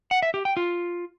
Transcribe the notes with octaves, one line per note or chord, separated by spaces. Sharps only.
F#5
E5
G4
G5
F4